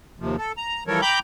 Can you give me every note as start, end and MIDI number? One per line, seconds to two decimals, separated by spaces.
0.20 0.36 39
0.20 0.36 48
0.20 0.36 53
0.38 0.52 69
0.57 0.84 82
0.87 1.01 52
0.87 1.01 53
0.87 1.01 55
0.87 1.01 69
0.87 1.01 70
0.87 1.01 73
1.02 1.19 79
1.02 1.19 82
1.02 1.19 83
1.02 1.19 86
1.02 1.19 91